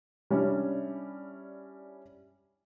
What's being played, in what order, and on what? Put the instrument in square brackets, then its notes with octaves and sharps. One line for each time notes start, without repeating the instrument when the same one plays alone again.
[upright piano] G3 C#4 D4 E4